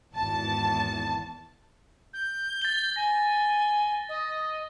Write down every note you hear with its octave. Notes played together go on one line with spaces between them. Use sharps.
G#1 E2 A5
G6
A6 G7
G#5 A#6
D#5